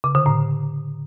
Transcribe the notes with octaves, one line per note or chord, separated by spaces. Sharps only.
C#3
D3
A2